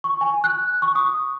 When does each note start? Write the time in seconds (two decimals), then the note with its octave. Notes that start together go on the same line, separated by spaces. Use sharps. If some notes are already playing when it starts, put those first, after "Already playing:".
0.04 C#6
0.21 G#5
0.44 F#6
0.82 C#6
0.95 D#6